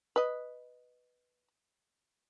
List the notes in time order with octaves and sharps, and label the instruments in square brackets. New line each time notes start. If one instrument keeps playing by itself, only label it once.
[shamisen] B4 D#5